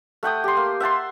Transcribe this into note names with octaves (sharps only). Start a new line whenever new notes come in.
A3 F#5 G5 D#6
G4 C6
A#3
E5 F#5 A5 C6